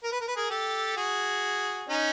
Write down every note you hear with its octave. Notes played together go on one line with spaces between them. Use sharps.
A#4
B4
A#4
B4
G#4 A#4
G4 A4
F#4 G#4
C#4 D#4